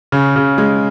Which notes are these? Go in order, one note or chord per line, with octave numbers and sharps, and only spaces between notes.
C#3
C#3
G#3